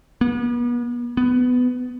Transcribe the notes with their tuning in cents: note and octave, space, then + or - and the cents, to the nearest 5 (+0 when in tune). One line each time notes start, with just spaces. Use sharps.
B3 -40
B3 +15